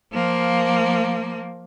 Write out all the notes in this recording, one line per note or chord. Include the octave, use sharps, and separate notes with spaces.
F3 A#3